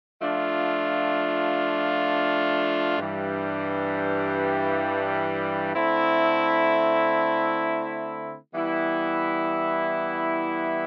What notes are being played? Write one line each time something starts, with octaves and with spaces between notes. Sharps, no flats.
F3 A3 D4 F4
G2 E3 G3
D3 A3 C4 E4
E3 G3 B3 E4